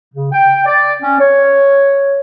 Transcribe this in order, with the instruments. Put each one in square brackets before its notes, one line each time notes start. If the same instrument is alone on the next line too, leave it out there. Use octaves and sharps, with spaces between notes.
[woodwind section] C#3
G5
D5
C#4
C#5